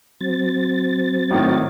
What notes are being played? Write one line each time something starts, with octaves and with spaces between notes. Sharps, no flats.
F#3 C4 A6
G#1 A2 D#3